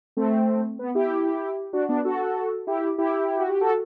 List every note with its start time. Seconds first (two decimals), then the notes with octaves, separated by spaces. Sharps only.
0.17 A3 C4
0.79 B3
0.95 E4 G4
1.73 D4 F#4
1.89 B3 D4
2.05 F#4 A4
2.67 E4 G4
2.98 E4 G4
3.37 F#4
3.49 G4
3.61 F#4 A4